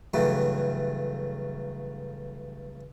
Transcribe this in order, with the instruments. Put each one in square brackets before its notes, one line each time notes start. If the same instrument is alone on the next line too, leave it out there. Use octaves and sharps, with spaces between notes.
[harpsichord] G2 C#3 E3 F#3 G3 A3